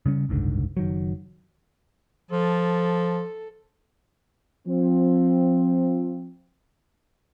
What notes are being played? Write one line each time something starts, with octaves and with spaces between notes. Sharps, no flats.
C#3 G3 C#4
F#1 C2 G#2 D3
F#1 D#3 F#3
F3 A4
F3 C4